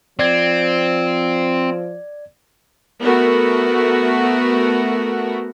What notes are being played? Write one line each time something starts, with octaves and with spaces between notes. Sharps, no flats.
F3 C4 D5 G#6
A3 B3 F#4 A#4